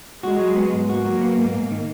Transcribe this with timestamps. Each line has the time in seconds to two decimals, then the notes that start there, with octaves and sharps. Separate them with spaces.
0.23 G#3 F#4
0.39 F#3
0.56 B3
0.73 G#2
0.89 A#3 F#4
1.05 F#3
1.21 B3
1.38 G#2
1.54 G#2
1.71 D#3